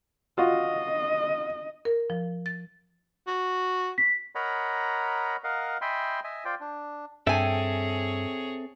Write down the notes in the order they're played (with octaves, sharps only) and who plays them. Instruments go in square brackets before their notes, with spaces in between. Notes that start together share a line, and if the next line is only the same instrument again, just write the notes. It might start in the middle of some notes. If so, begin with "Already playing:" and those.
[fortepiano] F4 F#4 [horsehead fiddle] D#5
[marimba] A#4
F3
A6
[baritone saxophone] F#4
[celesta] B6
[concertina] A#4 C#5 D#5 F#5 A#5 B5
A#4 D#5 F5 F#5
D#5 E5 G5 G#5 B5 C6
D#5 E5 G#5
F4 C5 D5 G5
D4
[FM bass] G2 [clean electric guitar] C4 A4 E5 [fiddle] G#4 C#5 [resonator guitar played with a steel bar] G5 G#5